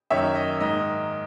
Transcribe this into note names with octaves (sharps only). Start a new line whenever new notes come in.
F#2 D#3 A#3 C#5 E5
D#5
G#2 D#3 A#3 D#5